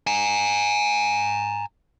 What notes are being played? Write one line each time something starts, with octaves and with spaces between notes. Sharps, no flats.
G#5 A#5